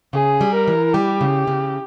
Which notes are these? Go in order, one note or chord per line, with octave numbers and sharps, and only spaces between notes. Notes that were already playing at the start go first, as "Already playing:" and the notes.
C#3 G#4
G3
A#4
E3
G3 G4
C#3
C#3